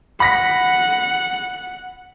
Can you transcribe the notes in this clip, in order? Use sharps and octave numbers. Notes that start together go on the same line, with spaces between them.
F#5 B5 A#6 B6